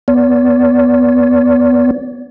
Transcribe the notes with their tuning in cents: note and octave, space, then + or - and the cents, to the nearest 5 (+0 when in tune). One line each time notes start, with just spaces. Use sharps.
B3 +0 D5 -40